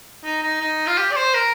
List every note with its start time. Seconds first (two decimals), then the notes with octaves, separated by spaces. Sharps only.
0.24 D#4
0.42 D#4
0.61 D#4
0.87 F4
0.98 G4
1.12 D5
1.16 C5
1.34 A#4